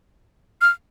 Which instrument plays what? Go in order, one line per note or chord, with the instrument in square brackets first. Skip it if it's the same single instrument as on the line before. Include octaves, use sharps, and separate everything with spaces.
[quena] F6